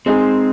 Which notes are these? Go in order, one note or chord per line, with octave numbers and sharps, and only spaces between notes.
G#3 C4 D#4 G#4